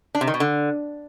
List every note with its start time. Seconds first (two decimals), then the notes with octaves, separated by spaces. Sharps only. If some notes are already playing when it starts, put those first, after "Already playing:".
0.15 D4
0.21 C3
0.27 D#3
0.34 B2
0.40 D3